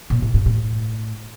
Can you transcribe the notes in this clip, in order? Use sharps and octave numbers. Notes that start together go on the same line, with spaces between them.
A#2
A2
G#2
A2